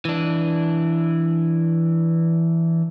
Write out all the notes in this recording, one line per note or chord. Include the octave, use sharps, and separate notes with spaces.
E3 D4